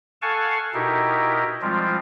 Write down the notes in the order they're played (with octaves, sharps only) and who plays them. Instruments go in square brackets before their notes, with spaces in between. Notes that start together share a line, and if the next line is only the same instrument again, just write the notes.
[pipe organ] A4 F5 F#5 G#5 A5 C#6
B2 D#4 E4 G4 A#4
F3 G3 G#3 C4 F4